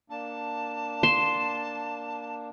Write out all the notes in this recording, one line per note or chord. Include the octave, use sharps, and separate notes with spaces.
A#3 D4 A5
C6 E7